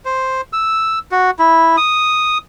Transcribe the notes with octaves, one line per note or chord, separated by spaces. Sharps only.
C5
E6
F#4
E4
D#6